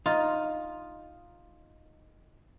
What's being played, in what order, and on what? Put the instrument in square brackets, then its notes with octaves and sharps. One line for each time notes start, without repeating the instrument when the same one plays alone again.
[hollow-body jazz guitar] D#4 [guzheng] F4